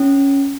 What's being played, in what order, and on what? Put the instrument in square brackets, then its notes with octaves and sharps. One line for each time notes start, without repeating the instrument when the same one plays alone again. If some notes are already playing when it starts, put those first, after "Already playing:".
Already playing: [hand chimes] C#4